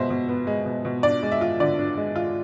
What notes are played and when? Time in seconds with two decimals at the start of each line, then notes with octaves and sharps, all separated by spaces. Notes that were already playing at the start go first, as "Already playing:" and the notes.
Already playing: B2 G#3 C5 E5
0.10 B2
0.29 B3
0.47 G#3
0.66 B2
0.85 B2
1.03 D4 D5
1.23 G#3
1.32 E5
1.41 F4
1.60 D3 D5
1.79 D4
1.97 G#3
2.16 F4